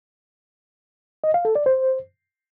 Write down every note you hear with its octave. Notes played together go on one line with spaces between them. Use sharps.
D#5
F5
A4
D5
C5